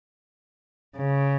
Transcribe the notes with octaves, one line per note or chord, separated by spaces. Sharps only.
C#3